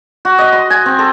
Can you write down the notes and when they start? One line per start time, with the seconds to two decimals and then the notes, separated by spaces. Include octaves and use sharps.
0.25 F#4
0.38 D#5
0.53 C6
0.70 G#5
0.86 C4
0.99 A4